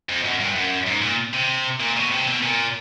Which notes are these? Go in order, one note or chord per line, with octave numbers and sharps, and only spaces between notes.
F2
F#2
G2
F#2
G#2
A#2
C3
A#2
B2
C3
B2
A#2